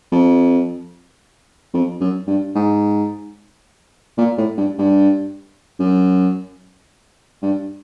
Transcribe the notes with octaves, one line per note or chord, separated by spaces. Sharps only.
F2
F2
F#2
G2
G#2
A#2
A2
G2
G2
F#2
G2